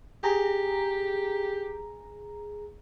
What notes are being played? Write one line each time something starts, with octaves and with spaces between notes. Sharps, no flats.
G4 G#4 A#5